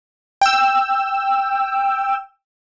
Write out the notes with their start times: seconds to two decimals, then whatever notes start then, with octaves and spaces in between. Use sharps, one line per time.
0.41 G5 E6